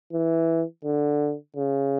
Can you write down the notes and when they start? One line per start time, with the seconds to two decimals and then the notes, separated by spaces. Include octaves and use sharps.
0.13 E3
0.85 D3
1.57 C#3